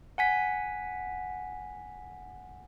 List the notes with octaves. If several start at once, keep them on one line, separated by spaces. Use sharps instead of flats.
F#5 G#5 B6